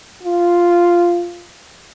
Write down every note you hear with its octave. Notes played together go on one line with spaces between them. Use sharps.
F4